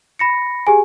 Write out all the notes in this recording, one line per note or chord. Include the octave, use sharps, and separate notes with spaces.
B5 A#6 C#7
G4 G#4 G#5